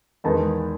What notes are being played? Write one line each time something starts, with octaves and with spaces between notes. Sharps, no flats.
E2 D#3 G#3 B3 D#4 A5